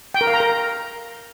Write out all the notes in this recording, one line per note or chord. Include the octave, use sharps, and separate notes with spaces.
G5
A#4
F5
A#5
A#4